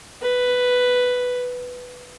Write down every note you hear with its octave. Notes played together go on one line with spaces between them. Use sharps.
B4